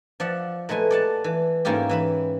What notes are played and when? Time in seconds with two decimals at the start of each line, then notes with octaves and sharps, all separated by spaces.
0.20 F3 D5 E5 F#5
0.69 A#2 G#3 A3 B4 G#5
0.91 D5 F#5 A5
1.24 E3
1.65 G#2 A#3 C#4 E4 F4 G4
1.89 E3 E5 B5